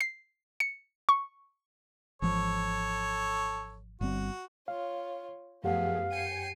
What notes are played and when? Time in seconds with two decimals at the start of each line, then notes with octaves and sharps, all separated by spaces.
0.01 C7
0.60 C#7
1.09 C#6
2.22 G#1 E3 F3 A4 C#5
4.01 G1 G3 C4 F#4
4.68 F4 C#5 F5
5.64 F#2 F3 A3 B3 G4 G#4 F5 F#5
6.12 G5 G#5 C7 C#7 D#7